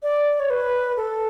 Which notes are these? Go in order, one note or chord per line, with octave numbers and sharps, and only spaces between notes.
D5
C#5
B4
A4